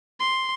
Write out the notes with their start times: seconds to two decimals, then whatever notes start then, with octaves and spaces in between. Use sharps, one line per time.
0.20 C6